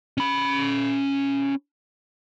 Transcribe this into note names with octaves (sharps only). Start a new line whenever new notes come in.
C#4 B5